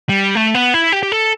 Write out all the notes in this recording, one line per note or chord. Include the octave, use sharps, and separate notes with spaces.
G3
A3
B3
E4
G4
G4
A4